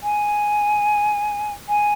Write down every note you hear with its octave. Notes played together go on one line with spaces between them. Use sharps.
G#5
G#5